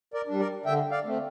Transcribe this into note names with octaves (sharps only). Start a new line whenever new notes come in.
A#4 D5
G3 D4
A#4 D5
D3 E5 G5
D5 F5
A3 C4